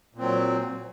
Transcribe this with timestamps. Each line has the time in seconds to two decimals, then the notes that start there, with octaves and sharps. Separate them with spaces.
0.14 A#2
0.18 C4
0.21 F#3